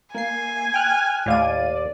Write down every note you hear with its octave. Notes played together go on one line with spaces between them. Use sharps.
A#3 G#5 C7
G5 F6 F#6
D#2 A2 D5 F5 D#7